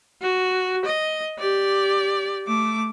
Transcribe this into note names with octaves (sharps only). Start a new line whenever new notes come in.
F#4
D#5
G4 D5
A3 D6